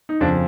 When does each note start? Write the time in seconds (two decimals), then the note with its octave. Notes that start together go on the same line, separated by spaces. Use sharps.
0.09 D#4
0.21 F2 C#3 F3 D4